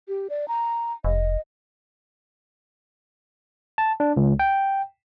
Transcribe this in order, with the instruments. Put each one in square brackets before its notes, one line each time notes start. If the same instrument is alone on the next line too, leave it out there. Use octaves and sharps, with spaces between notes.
[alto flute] G4
D5
A#5
[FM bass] F1 [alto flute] D#5
[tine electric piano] A5
D4
C#2
G5